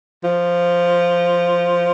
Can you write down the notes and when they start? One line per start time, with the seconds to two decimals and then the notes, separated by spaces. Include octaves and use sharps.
0.24 F3